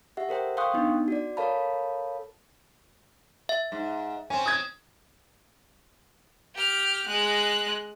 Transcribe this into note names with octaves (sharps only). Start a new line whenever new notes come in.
G4 E5 F#5
A4 A#4 C5 G5
F5 G5 C6 C#6 D#6 F#6
B3 D4 D#4
F#4 D5
A4 A#4 C#5 F5 A5 B5
E5
G#2
C4 C#4 G#5
D#6 G#6
G4 F6
G#3 F#6